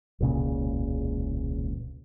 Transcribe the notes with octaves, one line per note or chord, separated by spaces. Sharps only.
E1 C#2 A#2 C#3